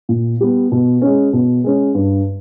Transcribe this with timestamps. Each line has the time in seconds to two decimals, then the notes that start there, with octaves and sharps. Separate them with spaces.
0.09 A#2
0.41 G3 B3
0.72 B2
1.02 G#3 C#4
1.33 B2
1.64 G#3 C#4
1.95 G2